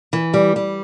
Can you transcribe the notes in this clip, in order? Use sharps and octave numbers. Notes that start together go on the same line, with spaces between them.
E3
G3
G3